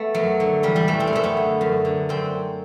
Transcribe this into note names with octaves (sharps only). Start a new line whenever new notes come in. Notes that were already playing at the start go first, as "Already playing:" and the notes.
Already playing: A3 B3
F#2 F#3
D3
E2 G3
G3
C3 E3 A3
C4
B3
F#2 A3
B3
D3
F#2
D3
F#2 C4